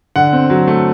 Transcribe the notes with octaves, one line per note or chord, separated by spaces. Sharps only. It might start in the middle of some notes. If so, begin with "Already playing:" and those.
D3 F#5
C4
F#3
A3